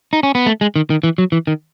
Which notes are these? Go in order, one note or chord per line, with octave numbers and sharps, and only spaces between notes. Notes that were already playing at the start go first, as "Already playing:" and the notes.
D#4
C#4
B3
A3
G#3
D#3
D#3
E3
F#3
E3
D#3